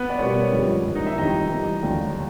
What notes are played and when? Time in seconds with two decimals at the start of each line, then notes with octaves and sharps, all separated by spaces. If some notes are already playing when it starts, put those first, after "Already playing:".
Already playing: B3 B4
0.10 D5
0.18 B2 G3 A#3 C#4 C#5
0.52 F2 D3 G3
0.84 G#2 E3 G3 A#3
0.95 D#4 D#5
1.06 E4 E5
1.17 F2 C3 D#3 G3 C4 D#4 D#5
1.50 E3 G3 B3
1.83 D#2 D3 F#3